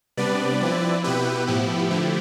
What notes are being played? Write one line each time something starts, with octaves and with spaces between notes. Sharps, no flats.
C3 G3 B3 D4 B4 D5
F3 C4 E4
B2 B3 E4 G4 B4
A2 F3 B3 E4 G4
D3 F3 A3 E4